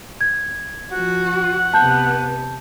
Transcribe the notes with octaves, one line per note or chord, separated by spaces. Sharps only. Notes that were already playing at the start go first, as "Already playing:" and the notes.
G#6
F3 F#4 F#5
C3 B3 A5 G6